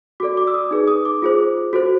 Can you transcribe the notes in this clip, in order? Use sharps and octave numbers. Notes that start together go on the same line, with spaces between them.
F#4 A4 D5 D6
D6
E6
D#6
D#4 G#4 B4
D#6
D6
F4 G#4 C5
F#4 A4 C5